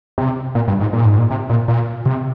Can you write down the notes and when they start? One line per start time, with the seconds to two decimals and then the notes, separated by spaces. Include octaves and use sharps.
0.18 C3
0.55 A#2
0.68 G2
0.80 G#2
0.93 A#2
1.05 G#2
1.18 A#2
1.31 C3
1.50 A#2
1.68 A#2
2.06 C3